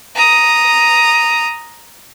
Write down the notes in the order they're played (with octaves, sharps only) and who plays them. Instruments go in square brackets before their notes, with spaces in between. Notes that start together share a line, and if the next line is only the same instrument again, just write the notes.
[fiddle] A#5 D#6